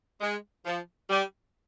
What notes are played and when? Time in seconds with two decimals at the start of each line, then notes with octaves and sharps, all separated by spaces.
0.21 G#3
0.65 F3
1.09 G3